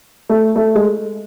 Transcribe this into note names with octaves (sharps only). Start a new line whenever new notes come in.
A3
A3
G#3